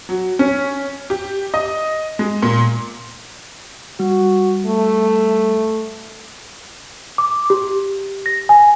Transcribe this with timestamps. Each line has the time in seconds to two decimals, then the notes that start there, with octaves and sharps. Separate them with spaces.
0.09 F#3
0.39 C#4
1.10 G4
1.54 D#5
2.19 G#3
2.42 A#2
4.00 G3 F#4
4.66 A3
7.18 D6
7.50 G4
8.26 A#6
8.49 G#5